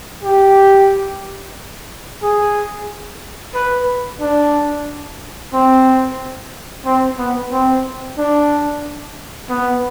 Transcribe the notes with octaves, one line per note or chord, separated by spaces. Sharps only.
G4
G#4
B4
D4
C4
C4
B3
C4
D4
B3